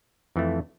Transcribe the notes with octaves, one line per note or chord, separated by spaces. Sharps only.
F2 E3 A3